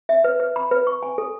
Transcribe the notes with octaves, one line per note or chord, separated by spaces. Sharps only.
E5
B4
B4
B5
B4
C#6
G#5
A4